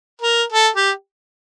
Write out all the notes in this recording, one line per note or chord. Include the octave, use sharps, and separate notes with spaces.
A#4
A4
G4